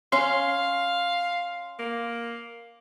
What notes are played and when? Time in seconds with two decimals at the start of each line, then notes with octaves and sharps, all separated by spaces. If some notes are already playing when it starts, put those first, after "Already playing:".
0.12 C#4 F5 C6
1.79 A#3